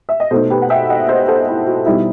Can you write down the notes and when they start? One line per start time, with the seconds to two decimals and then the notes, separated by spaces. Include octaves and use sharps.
0.09 E5
0.20 D#5
0.31 B2 A3 D#4 A4 C5
0.50 G4 B4
0.62 F#5
0.70 E5 G5
0.89 D#5 F#5
1.08 C5 E5
1.28 A4 C5
1.48 E4
1.67 F#4
1.86 B2 G3 D#4 E4